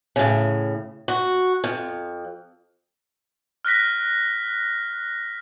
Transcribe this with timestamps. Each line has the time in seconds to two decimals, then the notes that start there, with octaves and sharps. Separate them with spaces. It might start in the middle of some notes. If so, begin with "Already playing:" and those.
0.16 A2 C#3
1.08 F#4
1.64 F2
3.65 F6 F#6 A#6 B6